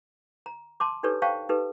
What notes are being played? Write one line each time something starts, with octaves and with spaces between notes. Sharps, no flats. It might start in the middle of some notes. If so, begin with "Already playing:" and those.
A#5
A5 C6 D6
D4 D#4 G4 A4 B4 C#5
C5 C#5 F5 G5 A5 C#6
D#4 G4 A4 B4